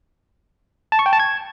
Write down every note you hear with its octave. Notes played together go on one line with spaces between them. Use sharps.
A5
C#6
G5
A5
G#6